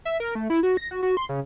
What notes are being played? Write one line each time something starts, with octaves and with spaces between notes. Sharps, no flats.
E5
A#4
A3
E4
F#4
A#6
F#4
F#4
C6
C#3